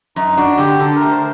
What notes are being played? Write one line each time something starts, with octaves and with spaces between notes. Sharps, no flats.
F#2 D#4
D4 F#4
D3 G4
D3 A4
A3 A#4
C5